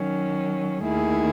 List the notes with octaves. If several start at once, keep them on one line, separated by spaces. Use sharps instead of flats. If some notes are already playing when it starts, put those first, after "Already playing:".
Already playing: D#3 F#3 C#4
D#2 D#3 A3 E4 G#4